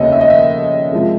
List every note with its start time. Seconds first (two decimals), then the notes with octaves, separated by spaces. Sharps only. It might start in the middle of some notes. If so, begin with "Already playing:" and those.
Already playing: F1 D#2 C#3 C#5 D#5 E5
0.12 E5
0.21 D#5
0.30 E5
0.92 C3 F3 G#3